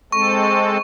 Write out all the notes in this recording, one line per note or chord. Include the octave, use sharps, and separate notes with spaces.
G#3 C4 A4 C#6